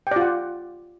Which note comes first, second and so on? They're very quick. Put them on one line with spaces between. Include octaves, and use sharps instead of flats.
G5 D5 F4 F#5